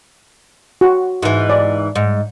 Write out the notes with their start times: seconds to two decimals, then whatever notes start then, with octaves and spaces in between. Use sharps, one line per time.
0.81 F#4
1.22 G#2 E3
1.50 D5
1.95 G#2